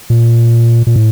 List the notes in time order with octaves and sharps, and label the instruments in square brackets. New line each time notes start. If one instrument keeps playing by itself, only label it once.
[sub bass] A#2
A#2
A2